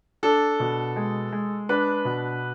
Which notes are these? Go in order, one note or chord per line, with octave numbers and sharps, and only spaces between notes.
D4 A4
B2
G#3
G#3
D4 B4
B2